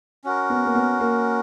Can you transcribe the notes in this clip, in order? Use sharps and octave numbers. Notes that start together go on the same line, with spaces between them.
C#4 F#4 A#4
B3
A#3
B3
A#3